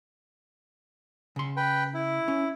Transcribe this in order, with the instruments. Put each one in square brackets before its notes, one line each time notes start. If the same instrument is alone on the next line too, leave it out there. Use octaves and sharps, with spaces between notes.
[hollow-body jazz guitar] C#3 C6
[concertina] B4 G5
E4
[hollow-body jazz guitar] C#4